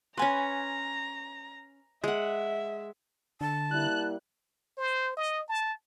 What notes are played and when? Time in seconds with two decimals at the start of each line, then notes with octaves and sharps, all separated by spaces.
0.17 C#4 B4 G#5 A#5 C6
2.04 G#3 E5 F#5
3.41 D3 A5
3.71 G3 A#3 E4 F#6
4.78 C5
5.17 D#5
5.49 A5